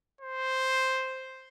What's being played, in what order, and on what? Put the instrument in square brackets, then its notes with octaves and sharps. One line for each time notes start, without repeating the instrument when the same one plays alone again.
[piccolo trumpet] C5